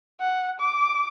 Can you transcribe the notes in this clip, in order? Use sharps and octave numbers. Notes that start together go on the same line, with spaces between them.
F#5
D6